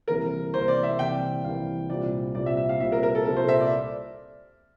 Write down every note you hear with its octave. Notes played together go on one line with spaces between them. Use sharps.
C2 C3 E3 A#3 A#4
C2 C3 E3 A#3 C5
D5
E5
C2 C3 E3 A#3 G5
C2 C3 E3 A#3 F5
C2 A#2 G3 C4 D5
C2 A#2 G3 C4 D5
E5
E5
F5
C2 A#2 G3 C4 E5
A#4
A#4
A4
C2 A#2 G3 C4 A4
C5
E5
D5